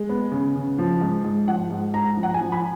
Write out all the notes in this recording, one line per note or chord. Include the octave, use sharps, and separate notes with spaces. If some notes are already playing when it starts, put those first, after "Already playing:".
Already playing: G#3
B3
C#3
C#3
F3
G#2
G#2
F3 F#5
G#2
G#2 A#5
F3
F#5
G#5
F3
B5